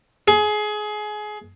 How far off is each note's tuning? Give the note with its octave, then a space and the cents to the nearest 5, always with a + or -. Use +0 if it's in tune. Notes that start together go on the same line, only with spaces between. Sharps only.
G#4 +25